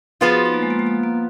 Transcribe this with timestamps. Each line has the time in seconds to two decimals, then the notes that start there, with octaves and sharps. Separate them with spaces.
0.21 F3 B3 F4 G#4
0.29 F#4
0.46 D#4
0.54 A#3
0.63 G#3
0.70 A#3
0.79 G#3
0.87 A#3
1.03 A#3